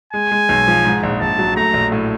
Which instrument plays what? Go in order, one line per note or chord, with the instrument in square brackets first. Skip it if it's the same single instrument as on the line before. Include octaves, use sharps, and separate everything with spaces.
[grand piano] G#3 [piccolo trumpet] G#5
[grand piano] G#3
B1
F3
G#2
A#1
[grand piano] A#1 [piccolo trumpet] A5
[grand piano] F#3
[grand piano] A3 [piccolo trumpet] A#5
[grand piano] A#1
A2